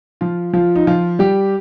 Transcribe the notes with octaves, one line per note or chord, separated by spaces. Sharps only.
F3 F4
F3 F4
D#4
F3 F4
G3 G4